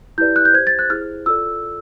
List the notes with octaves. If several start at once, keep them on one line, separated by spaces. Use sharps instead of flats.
E4 G4 B4 D5 G6
F#6
G6
G4 C5 G#6
A6
F#6
E4 G#4 C5 F6
F4 A4 D5 E6